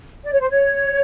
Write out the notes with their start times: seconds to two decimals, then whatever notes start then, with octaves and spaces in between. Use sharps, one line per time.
0.24 D5
0.33 C#5
0.41 C5
0.50 C#5